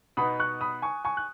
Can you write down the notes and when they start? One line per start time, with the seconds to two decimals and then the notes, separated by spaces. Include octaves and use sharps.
0.17 B2 B3 D#4 B5 D#6
0.39 C#6 F#6
0.61 B5 D#6
0.82 G#5 C#6
1.05 G#5 C#6
1.17 F#6